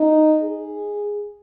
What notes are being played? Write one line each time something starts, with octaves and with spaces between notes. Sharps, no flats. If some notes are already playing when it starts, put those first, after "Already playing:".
Already playing: D#4
G#4